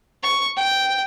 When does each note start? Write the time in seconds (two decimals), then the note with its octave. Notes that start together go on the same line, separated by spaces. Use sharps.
0.23 C#6
0.56 G5